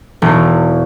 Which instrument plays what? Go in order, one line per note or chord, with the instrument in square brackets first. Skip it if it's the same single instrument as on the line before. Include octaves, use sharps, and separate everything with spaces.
[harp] E1